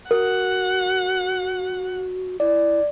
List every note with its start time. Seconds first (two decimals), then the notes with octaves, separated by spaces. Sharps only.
0.11 F#4 A#4 F#5
2.40 E4 D5